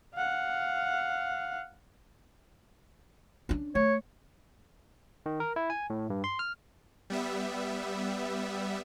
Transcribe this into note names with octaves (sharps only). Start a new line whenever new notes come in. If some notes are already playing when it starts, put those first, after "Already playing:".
F5 F#5
C#4 D4
A3 C#5
D#3
A#4
E4
G#5
A2
G2
C6
F6
G3 B3 E5